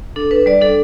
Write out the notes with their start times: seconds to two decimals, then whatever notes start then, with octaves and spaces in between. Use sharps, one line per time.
0.16 D4 A4
0.31 D4 B4
0.46 G3 D5
0.61 D4 A4